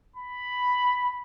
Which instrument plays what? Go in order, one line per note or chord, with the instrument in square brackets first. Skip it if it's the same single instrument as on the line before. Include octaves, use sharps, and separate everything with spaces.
[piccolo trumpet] B5